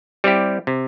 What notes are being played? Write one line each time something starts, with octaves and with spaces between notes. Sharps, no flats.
G3 C4 E4 G4
C3